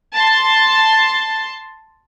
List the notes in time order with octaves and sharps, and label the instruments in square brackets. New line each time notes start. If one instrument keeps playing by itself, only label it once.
[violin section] A5 C6